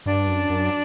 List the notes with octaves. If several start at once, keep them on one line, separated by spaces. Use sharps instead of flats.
G2 D4
F#2
F#2